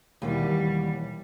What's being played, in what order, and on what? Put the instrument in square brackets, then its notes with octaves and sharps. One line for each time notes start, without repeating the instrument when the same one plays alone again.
[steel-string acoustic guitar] D#2 B2 E3 [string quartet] G3